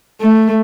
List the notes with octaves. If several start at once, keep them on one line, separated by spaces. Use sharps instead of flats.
A3